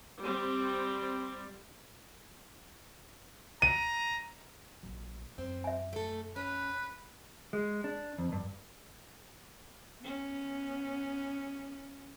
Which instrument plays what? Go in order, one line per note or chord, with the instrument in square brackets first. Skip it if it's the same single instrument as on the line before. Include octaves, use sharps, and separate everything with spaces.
[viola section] G3 C4
[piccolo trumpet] A#5 [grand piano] D#7
[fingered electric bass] A#1 A#2 F#3
[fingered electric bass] F#2 [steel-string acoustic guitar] C4
[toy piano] E5 G#5
[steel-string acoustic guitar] A3 A4
[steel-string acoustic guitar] C#4 [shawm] B4
[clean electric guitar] G#3
D4
F2
G2
[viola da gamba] B3 C#4